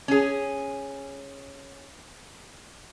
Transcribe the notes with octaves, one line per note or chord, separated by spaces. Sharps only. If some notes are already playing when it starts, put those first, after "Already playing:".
C#4 G#4